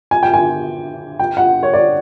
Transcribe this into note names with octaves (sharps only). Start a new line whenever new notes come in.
G#5
G5
G#5
G5
F#5
C#5
D5